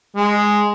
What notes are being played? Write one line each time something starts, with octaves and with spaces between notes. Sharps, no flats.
G#3